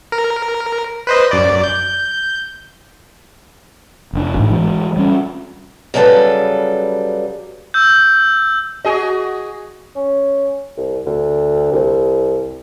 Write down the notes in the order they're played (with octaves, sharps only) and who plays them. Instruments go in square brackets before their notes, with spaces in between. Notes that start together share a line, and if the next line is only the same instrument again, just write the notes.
[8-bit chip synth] A#4
B4 C5 D#5
F#2 D5
G6
[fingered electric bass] F1 D4
A1 E2 G#2
E3 G#3
G3 C#4
[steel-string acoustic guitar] C#3 F#3 G3 F4 A4 B4
[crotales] E6 G6
[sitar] F#4 G#4 D#5
[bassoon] C#4
C2
D2
C2